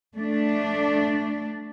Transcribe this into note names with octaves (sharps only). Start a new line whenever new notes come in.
A3 D4